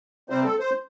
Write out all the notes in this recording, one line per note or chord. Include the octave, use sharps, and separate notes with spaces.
C3 G3 C4 C5
A4
C5